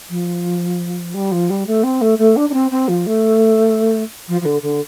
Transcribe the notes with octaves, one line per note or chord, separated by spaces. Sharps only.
F3
G3
F3
G3
A3
C4
A3
A3
D4
D4
C4
C4
F3
A3
F3
F3
D3
D3